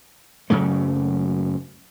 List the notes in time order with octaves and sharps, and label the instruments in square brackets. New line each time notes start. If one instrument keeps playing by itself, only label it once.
[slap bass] F#2 C#3 F#3 A3